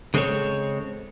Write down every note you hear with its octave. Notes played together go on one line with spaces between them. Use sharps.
C#3 G#3 C4 C#4 A4 C#5